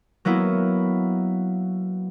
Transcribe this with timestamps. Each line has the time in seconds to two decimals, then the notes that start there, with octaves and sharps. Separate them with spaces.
0.25 F#3 A#3 B3 E4